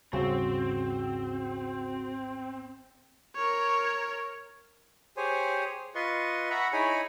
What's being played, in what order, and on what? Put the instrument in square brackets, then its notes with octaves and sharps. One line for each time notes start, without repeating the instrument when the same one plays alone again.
[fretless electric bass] G#1 D#2 G3 [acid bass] C#3 [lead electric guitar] C4 [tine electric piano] F#4
[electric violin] A#4 C#5
[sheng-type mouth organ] G4 G#4 C5 C#5 G#5
F4 B4 D#5 C6 C#6
E5 F#5 A#5 B5 C#6
D#4 E4 G#4 C#5 G#5 B5